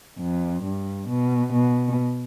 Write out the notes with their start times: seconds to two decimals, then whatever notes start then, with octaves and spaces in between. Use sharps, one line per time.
0.19 F2
0.63 G2
1.09 B2
1.53 B2